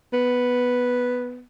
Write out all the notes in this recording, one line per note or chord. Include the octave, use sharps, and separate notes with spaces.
B3